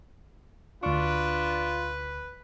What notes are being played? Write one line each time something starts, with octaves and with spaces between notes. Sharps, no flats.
D2 D4 F4 B4 C#6